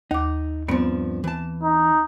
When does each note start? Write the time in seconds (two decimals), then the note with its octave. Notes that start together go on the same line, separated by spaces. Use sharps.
0.11 D#2 D#4 D6
0.68 G2 F3 B3 C4
1.24 E3 A5
1.63 D#4